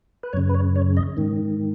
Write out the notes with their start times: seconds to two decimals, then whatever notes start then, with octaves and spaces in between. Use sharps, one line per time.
0.23 B4
0.33 F#2 C#3 C#5
0.49 B4
0.54 C#5
0.76 C#5
0.97 D#5
1.17 G#2 D#3